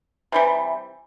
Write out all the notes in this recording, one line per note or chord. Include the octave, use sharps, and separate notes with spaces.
C3 E3 G3